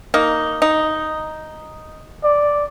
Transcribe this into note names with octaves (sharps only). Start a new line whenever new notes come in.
A#3 D#4
D#4
D5